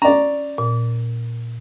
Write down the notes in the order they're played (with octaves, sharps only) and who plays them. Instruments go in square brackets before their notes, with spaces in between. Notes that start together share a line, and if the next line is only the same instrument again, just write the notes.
[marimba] C#4 [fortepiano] D5 A#5
[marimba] A#2